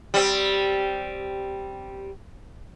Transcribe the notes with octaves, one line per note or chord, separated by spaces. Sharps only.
G3 C4